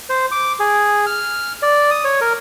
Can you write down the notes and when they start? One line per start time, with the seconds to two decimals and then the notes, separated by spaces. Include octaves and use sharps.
0.09 C5
0.32 D6
0.60 G#4
1.06 F6
1.62 D5
1.91 D#6
2.04 C#5
2.21 A#4